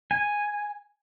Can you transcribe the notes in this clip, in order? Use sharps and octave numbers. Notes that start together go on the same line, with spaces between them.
G#5